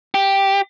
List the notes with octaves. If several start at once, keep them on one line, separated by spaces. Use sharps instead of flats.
G4